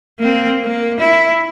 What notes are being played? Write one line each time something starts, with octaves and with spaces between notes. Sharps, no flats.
A#3 C4
A#3
E4